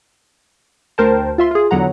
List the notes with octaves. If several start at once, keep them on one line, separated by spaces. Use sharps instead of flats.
D2 A#4 C5 G5 A5
F4 E5 C6
F4 G#4
E2 D3 F#3 B3 F#5 A#5